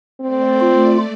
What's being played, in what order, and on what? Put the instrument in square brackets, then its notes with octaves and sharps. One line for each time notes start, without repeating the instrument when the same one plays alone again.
[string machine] A3 D5 [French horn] C4
[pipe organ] F4